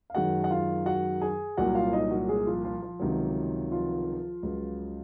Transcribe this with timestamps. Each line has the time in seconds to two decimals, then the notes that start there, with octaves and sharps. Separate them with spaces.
0.10 F5
0.15 F#2 D#3 G#3 F#4 F#5
0.44 F#5
0.51 F4 F5
0.86 F#4 F#5
1.21 G#4 G#5
1.57 C2 A#2 F#3 F#4 F#5
1.75 F4 F5
1.93 D#4 D#5
2.11 F#3 F#4
2.29 G#3 G#4
2.46 F3 F4
2.64 F3 F4
2.82 F3 F4
2.99 C#2 C3 D#3 F#3
3.71 F3 F4
4.43 C#2 C#3 F#3